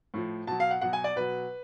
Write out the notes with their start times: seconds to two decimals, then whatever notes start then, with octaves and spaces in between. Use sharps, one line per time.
0.14 A2 F3
0.47 B2 F#3 A5
0.60 F5
0.71 F#5
0.81 B2 F#3 F#5
0.93 G#5
1.04 D5
1.16 B2 F#3 B4